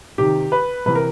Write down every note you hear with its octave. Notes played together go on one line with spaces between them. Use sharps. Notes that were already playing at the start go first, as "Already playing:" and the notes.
C3 D#3 G4
B4
C3 E3 B4
A#4